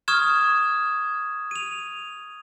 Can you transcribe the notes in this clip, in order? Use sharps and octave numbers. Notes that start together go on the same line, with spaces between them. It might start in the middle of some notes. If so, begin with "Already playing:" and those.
C#6 D#6 F6 G#6 E7
D#7 F7